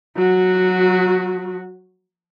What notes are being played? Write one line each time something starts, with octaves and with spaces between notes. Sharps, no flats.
F#3 F#4